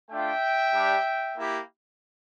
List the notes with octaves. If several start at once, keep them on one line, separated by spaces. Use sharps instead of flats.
A3 D4 F4 E5 G5
G3 D4 G4
A#3 E4 G4